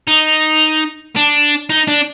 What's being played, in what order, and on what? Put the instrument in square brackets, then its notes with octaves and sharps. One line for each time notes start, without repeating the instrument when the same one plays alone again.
[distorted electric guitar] D#4
D4
D#4
D4